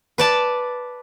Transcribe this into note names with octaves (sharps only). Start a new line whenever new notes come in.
B4 D5 A5